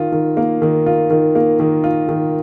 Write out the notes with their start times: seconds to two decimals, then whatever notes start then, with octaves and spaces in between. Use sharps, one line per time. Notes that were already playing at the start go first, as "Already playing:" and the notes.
Already playing: D#3 F4
0.12 D#3
0.37 A#3
0.62 D#3
0.86 F4
1.10 D#3
1.35 A#3
1.60 D#3
1.84 F4
2.09 D#3